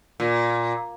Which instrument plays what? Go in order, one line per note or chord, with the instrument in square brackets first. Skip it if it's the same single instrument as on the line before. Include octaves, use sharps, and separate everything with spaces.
[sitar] A#2